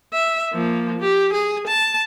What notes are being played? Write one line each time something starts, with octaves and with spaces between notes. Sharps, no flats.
E5
F3 A#3
G4
G#4
A5